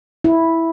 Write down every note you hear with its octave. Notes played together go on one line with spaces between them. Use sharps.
E4